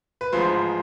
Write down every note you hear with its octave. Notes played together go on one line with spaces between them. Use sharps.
B4
A1 G#2 F3 G#3 C5